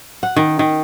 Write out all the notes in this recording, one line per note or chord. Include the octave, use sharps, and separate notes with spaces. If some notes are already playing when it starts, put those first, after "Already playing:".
F#5
D#3
D#3